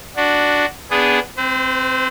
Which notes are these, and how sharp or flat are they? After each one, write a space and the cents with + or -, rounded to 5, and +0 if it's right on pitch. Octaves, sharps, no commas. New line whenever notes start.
D4 +0 F#4 +0
B3 +0 D4 -15 G#4 -10
C4 +0 C5 -40